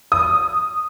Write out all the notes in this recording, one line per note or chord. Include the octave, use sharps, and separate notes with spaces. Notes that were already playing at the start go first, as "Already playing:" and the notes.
D#6